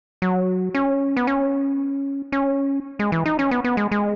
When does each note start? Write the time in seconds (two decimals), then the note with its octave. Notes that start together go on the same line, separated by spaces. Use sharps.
0.22 F#3
0.75 C#4
1.17 B3
1.27 C#4
2.32 C#4
2.99 G#3
3.12 E3
3.26 D#4
3.39 C#4
3.51 B3
3.64 B3
3.77 G#3
3.92 G#3